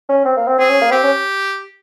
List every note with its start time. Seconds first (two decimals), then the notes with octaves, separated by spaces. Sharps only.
0.09 C#4
0.25 C4
0.37 A#3
0.47 C4
0.59 C4 G#4
0.69 C#4
0.81 A#3
0.91 C4 G4
1.03 C#4